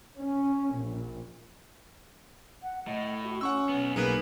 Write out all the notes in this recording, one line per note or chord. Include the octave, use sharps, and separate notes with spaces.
C#4
A#1
F#5
A2 D#5
F#4
C#4 F#5 C#6 E6
B1 B3
B1 A#3 B3 D#4 G#4 B4